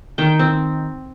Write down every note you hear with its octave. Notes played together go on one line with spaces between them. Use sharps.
D#3 G5
C4